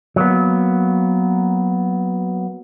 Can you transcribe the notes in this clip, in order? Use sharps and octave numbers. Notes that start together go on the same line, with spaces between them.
F#3 A#3 B3